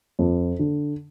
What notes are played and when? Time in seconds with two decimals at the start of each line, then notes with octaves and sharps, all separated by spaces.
0.19 F2
0.59 D3